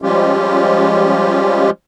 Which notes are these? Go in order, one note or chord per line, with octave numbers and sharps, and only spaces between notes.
F3 G3 G#3 C#4 F4 G4